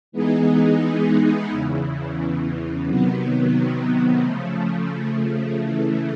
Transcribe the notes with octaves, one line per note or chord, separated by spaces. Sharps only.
E3 G#3 B3 D#4 G#4
E2 C#3 E3
C3 D#3 F#3 B3
C#3 F3 A3
C#3 E3 A3